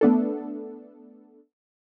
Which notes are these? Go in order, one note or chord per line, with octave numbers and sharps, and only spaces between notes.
A3 B3 D4 A4